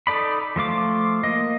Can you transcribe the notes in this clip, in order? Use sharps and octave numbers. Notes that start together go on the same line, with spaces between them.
D#4 A4 D5 B5
F3 A3 F4 D6
A#3 D#5